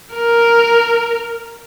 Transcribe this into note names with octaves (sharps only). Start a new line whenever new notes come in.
A#4